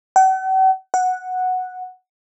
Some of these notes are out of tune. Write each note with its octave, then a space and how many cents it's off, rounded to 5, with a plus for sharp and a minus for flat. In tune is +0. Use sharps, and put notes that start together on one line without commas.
F#5 +45
F#5 -5